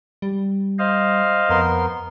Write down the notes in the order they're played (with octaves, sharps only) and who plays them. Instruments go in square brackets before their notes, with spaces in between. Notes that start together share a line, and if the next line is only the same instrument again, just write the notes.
[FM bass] G3
[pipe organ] C5 D#5 F5
[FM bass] F2 [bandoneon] B3 A#4 C6